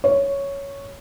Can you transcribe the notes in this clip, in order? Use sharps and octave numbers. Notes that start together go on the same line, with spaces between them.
C#5